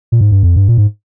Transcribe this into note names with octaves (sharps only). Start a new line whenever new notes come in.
A#2
G#2
G2
F2
G2
A#2
G#2